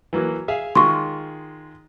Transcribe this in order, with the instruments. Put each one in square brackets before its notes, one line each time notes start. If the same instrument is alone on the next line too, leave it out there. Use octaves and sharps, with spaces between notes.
[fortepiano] E3 F#3 A#3
G#4 E5 F5
[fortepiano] D#3 G#3 F4 [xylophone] C6 C#6